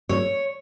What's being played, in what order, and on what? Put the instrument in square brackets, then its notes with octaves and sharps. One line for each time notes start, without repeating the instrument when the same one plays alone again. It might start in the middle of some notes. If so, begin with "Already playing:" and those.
[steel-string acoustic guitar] C#5